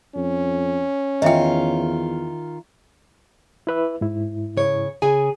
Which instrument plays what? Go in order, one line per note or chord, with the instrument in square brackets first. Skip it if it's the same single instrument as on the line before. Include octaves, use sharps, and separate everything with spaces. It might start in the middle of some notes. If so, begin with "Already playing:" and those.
[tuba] F2 [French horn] C#4
[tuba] E2 [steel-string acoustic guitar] D#3 F4 [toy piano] D#5 E5 G5
[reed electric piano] E4 B4 E5
G#2 E4
[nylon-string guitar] C#3 C#5
C#3 G#4 G#5